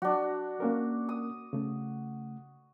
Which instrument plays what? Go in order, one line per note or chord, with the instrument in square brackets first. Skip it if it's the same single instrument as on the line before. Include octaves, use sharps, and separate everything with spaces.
[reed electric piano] F#3 [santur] D4 F#4
[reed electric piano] A#3 C#4 A#4
[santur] D#6
[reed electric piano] C#3 A3